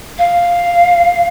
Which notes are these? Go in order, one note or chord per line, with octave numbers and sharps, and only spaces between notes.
F5